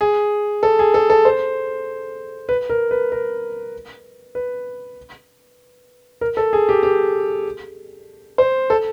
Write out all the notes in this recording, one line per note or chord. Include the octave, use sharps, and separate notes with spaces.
G#4
A4
G#4
A4
A4
C5
B4
A#4
B4
A#4
B4
A#4
A4
G#4
G4
G4
C5
A4